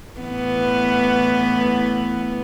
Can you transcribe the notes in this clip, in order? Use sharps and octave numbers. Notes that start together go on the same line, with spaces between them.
A2 E3 B3